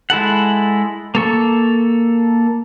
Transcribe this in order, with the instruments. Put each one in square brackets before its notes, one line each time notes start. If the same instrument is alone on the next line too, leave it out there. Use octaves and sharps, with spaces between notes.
[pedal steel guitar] G#3 E4 A4 F#5
A#3 A4 C#6